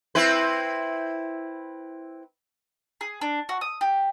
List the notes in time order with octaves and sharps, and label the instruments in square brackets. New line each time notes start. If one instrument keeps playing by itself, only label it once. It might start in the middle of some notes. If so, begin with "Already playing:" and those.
[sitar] C4 E4 B4
[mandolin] G#4
D4
F#4
D#6
G4